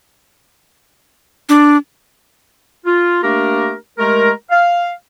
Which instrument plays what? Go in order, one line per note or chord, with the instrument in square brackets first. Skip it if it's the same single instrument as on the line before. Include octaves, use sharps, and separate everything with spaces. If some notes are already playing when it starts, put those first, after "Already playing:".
[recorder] D4
[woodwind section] F4
A3 A#3 D4 G4 A#4
G#3 A3 G4 A#4
F5